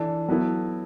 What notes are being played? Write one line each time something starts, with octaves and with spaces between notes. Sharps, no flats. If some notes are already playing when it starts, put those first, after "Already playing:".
Already playing: E3 D4 A4
F#3 B3 E4 A4